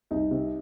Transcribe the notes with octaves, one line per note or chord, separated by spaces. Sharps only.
C2 D#4
C3